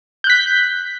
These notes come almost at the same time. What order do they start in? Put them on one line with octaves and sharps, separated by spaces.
G6 F#6 B6